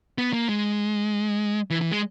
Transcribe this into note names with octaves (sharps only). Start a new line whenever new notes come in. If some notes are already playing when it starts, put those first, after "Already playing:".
B3
A#3
G#3
E3
E3
G#3